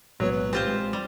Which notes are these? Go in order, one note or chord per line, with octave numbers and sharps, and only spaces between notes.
B1 A2 F#3 G#3 B3 C#5
B4
C4 F4 G4 C5
A#1 G3 G#3
G3